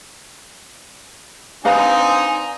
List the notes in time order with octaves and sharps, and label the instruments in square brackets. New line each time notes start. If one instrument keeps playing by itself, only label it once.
[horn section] C4 D4 D#4 [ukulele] B4 F5 A#5 [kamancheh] G#5